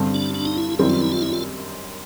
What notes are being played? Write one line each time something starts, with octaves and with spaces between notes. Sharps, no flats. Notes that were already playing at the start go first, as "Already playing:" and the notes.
Already playing: G2 D3 G3 C4
D4
D4
D#4
E4
F#2 D#3 G3 C4 E4
F4
E4
F4
E4
F4